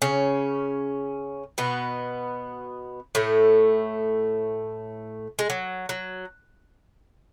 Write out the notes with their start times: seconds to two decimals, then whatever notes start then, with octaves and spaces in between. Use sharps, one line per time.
0.02 C#3 C#4
1.58 B2 B3
3.15 A2 A3
5.39 G#3
5.50 F#3
5.89 F#3